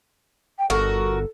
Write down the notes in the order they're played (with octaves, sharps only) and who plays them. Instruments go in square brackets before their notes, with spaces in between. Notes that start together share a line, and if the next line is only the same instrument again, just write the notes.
[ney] G5
[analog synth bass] G1 [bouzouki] F#4 A#4 [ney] A4